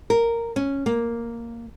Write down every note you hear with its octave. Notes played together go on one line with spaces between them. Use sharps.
A#4
C#4
A#3